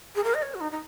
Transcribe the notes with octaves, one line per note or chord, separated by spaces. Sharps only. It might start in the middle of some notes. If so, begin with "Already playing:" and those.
G#4
A#4
D#5
C#5
F#4
D#4
D#4